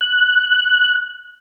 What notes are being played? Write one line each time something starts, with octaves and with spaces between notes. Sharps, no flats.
F#6